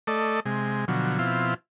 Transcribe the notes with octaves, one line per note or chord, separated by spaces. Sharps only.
A3 A4 D5 D#5
C3 G#3
B2 D3 F3 F#3
B2 F3 C4 E4 F4